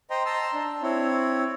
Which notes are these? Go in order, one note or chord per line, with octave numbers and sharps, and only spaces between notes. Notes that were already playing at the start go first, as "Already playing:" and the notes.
C5 D#5 G5 A#5 C6
A5 A#5 C6 E6
D4
C4 E4 C#5